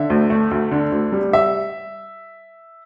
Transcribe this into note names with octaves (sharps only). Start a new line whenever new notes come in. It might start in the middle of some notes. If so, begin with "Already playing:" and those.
Already playing: D3 E5
D2
A3
D2
D3
D2
G3
E5